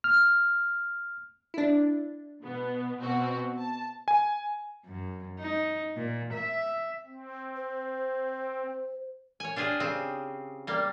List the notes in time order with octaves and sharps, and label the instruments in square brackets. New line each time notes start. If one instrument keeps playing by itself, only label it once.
[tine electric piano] F6
[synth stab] D4 E4
[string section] B2 B3
B2 C4 F#4
A5
[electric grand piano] G#5
[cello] F#2
D#4
A#2
E5
[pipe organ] C4
[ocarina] C5
[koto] C#5 G#5
D4 F4 G4 G#4
C#3 C4
G3 A#3